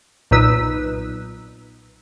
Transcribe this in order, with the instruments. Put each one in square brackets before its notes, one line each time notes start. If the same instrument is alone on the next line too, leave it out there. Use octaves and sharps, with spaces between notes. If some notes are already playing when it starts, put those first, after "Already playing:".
[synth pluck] B1 A#2 D#4 B4 E6